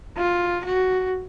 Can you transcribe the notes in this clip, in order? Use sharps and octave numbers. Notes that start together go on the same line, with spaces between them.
F4
F#4